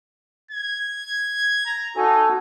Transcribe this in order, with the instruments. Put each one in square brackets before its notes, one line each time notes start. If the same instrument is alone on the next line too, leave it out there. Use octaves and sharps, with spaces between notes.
[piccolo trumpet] G#6
A#5
[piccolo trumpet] D#4 [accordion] F#4 A4 G#5